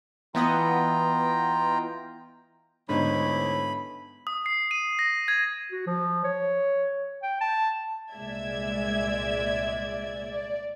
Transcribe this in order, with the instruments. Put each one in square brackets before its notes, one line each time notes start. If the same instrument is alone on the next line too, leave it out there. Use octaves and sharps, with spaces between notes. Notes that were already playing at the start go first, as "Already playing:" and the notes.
[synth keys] E3 B3 D#5 [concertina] F4 G5 A#5
[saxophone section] D2 E4 C#5 [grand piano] G#2 [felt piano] D3 B3 [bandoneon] B5
[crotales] D#6
C7
D#7
A#6
G#6
[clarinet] F#4
F3
C#5
G5
A5
[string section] C2 A#2 G#3 D5 E5 G#6
D5